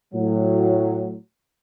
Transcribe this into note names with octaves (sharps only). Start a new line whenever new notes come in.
A2 F#3